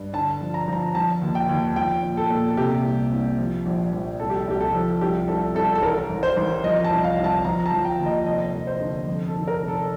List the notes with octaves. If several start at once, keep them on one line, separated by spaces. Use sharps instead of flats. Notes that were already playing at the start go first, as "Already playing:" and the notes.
Already playing: G2
D3 A5
F3
A#5
F3 A#5
F3 A5
D#2
G5
D#2
F3 G5
A#2
A4
A#2
A4
C3 G4
C2
C2
F3
A#1
A#1
C2 A4
G4
C2 G4
A4
F3
C2 G4
C2 A4
C2 A4
A4
A1 A#4
A1
C5
A1
F3 D#5
A5
C2
F5
C2
A5
F3 A#5
A5
F3
G5
D#2
D#5
F1 D#5
F1
C5
D3
F2
A4
D#3
A#4
F1
A4